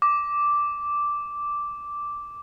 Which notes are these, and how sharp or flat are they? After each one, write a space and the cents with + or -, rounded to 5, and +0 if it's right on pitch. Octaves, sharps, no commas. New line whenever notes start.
D6 -5